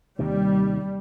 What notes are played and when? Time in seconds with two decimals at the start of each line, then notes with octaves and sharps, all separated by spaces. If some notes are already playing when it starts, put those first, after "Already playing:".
0.19 D#2 C3 D#3 G3